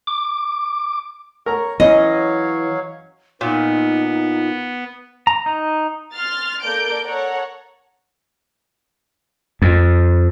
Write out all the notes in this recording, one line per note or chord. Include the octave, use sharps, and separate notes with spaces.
D6
A#4 C#5 A#5 C#6
E3 F#3 C#4 C#5 D#5 F5
A#2 B3 D#4
A#5
D#4
C6 F6 A6
A#3 A4 A#4 D5 G6 D7
A4 C#5 F#5 A#5
F2